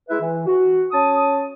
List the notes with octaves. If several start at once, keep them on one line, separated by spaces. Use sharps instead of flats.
G#3 E4 B4 E5
E3
F#4
C#4 A5 D#6